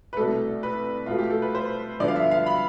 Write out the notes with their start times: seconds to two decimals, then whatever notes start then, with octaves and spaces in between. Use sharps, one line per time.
0.13 B4
0.17 C2 B2 A3 A4
0.63 B4
1.06 B2 A3 F4
1.18 G4
1.30 A4
1.42 B4
1.55 C5
2.00 G2 D3 F3 B3 D5
2.08 F5
2.16 E5
2.31 F5
2.46 B5